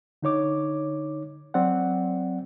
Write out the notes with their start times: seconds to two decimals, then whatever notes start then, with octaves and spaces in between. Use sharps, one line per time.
0.23 D3 D#4 C#5 D6
1.54 F#3 C4 D5 F#5